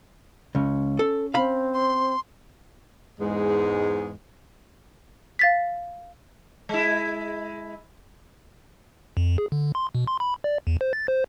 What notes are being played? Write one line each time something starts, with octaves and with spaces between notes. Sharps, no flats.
C#2 C#4
A4
C4 F5 B5
C6
E2 G#2 G#3
F5 A6 B6
G#3 E4
F2
G#4
D3
C6
B2
C6
B5
D5
E2
C5
A6
C5